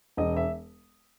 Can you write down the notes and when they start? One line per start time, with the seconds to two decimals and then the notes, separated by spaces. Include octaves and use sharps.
0.17 E1 D#5
0.37 E5